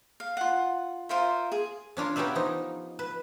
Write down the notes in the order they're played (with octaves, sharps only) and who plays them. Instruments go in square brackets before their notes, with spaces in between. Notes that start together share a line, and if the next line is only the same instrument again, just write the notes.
[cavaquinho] F5
F4 F#5
F4 A#4 C5 E5
G#4
[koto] C#4 D4 F4 A#4
B3 C#4 G4 A#4 D5 E5
F3 D#4
B4